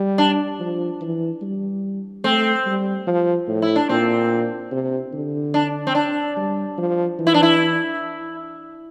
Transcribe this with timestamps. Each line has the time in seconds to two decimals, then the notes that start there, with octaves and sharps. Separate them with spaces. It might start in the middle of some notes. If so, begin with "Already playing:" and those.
Already playing: G3
0.18 D4
0.60 F3
1.01 E3
1.42 G3
2.24 A3 C4
2.66 G3
3.07 F3
3.48 A2
3.62 E4
3.76 D4
3.89 A#2 C4
4.72 C3
5.13 D3
5.54 D4
5.87 C4
5.95 D4
6.37 G3
6.78 F3
7.19 E3
7.27 E4
7.34 D4
7.43 E4